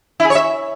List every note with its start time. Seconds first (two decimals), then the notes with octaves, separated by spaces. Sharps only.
0.20 E4
0.25 G#4
0.30 C#5
0.35 E5